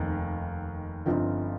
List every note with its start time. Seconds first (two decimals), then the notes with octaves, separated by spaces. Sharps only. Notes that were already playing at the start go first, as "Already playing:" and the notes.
Already playing: F1 D#2 D#3
1.06 G1 G2 F3 C4 D#4